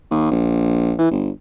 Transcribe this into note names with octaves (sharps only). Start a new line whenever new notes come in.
D#2
A#1
E3
G1